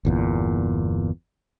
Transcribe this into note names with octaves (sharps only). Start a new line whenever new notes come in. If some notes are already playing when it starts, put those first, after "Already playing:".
G1 E2 A#2